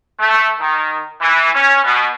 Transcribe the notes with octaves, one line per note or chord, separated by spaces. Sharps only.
A3
D#3
E3
C#4
B2